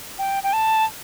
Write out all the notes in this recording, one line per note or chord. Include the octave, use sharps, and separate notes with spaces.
G5
G5
A5